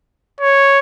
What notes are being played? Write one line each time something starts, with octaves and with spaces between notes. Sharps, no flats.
C#5